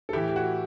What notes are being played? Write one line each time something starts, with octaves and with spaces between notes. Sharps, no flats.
A4
A2 E3 E4 G4
G4
F#4